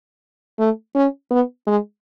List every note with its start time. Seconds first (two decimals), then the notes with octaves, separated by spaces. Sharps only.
0.59 A3
0.95 C#4
1.31 B3
1.67 G#3